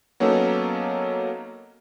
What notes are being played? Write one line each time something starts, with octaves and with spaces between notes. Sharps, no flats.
F#3 A#3 B3 C#4 D#4 A4